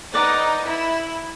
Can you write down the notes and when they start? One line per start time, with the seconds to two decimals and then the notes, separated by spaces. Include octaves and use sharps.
0.14 D#4 B4 D5 F#5
0.64 E4